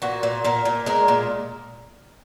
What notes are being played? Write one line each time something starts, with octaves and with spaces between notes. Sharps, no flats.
A#2 F#4
A#2
A#2 A#4
A#2
G#3 A#4
A#2